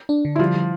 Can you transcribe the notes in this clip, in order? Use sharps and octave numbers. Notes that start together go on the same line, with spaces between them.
D4
D3
E4
F3 G3 F4
G3